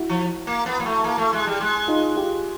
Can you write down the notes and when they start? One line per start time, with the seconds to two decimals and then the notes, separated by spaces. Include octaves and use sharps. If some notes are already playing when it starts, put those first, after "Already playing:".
Already playing: E4 F#4
0.09 F3
0.47 A#3
0.66 B3
0.80 A#3
0.85 A3
1.04 A#3
1.18 A3
1.33 G#3
1.47 G3
1.60 G#3
1.88 D#4 F4
2.17 F4 G4